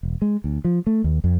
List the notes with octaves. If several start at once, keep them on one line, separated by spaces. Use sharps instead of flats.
E1
G#3
D2
F3
A3
D#2
F2